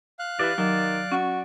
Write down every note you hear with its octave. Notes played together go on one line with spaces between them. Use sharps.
F5 F#6
E3 G4 B4 D5
D#3 F#3 D5
C#4 F#4